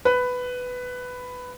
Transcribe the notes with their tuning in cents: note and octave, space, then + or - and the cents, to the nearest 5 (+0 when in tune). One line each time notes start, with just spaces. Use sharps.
B4 +10